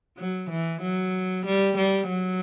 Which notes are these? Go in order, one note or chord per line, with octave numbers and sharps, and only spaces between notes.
F#3
E3
F#3
G3
G3
F#3